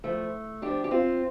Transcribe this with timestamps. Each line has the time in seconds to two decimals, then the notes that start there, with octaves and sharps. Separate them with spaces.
0.04 A2 F3 A3
0.62 A2 F3 D4 G4
0.84 G4
0.91 C4 F4